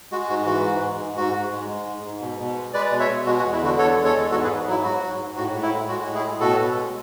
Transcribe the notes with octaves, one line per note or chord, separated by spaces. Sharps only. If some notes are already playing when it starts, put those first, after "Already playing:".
G#3 F#4
G#2 F#4
E3 F#4
G#2
G#3
G#2
G#2 F#4
G#2
G#3
G#3
G#2
G#2
B2
B2
G#3
G#3 B4 D5
B2
C#5 E5
B2
G#3 F#4
F#4
E2
E4
D3 F#4
E2 A4 C#5
G#3
A4 C#5
E2
G#2 F#4 A4
G#4 B4
G#2
F#3 E4
F#3 F#4
G#2
G#2
A2 F#4
A2
E4
G#3
G#3 F#4
A2
E4 G#4
A2
B2 F#4 A4
B2
G#3